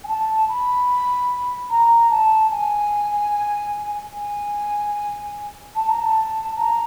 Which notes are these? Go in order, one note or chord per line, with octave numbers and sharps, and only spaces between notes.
G#5
A5
B5
A#5
A5
G#5
G#5
A5
A#5
A5
A#5